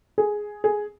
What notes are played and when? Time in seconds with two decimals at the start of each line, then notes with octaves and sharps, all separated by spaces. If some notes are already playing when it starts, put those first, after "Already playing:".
0.18 G#4
0.64 G#4